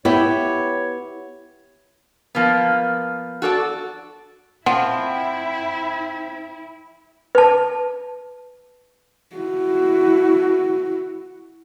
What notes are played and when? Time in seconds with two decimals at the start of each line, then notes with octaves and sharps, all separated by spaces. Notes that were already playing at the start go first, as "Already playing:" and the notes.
0.05 B3 E4 G4 C#5
2.35 F3 A#3 B3
3.42 F#4 A4 C#5 D5
4.66 F3 C4 E4 F#5
7.35 B4 A5
9.36 E4 F#4